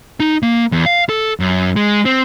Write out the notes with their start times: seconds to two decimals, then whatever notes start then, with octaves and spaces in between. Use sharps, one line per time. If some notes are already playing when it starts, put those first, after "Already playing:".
0.20 D#4
0.43 A#3
0.72 E2
0.86 F5
1.09 A4
1.40 F#2
1.76 G#3
2.05 C4